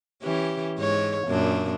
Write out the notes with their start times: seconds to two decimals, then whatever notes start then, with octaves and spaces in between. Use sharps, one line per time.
0.23 E3 C#4 G4
0.79 G#2 C#5
1.28 F#2 A#2 D4